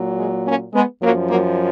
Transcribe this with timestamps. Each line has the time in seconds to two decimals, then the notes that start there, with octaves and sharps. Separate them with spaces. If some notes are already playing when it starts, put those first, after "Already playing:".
Already playing: A#2 F#3
0.19 G#3
0.46 A#3 C#4
0.74 G#3 B3
1.02 F#2 F3 F#3 A#3
1.30 F#3 A#3